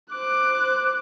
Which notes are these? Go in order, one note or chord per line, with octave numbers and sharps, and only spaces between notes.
C5 D6 F#6